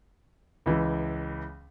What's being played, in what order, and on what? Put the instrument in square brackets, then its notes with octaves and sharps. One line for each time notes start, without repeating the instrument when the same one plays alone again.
[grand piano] C#2 E3